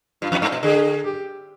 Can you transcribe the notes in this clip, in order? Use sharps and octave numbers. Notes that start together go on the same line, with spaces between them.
G2 F4
F2
G2
B2
D3 G#4
G4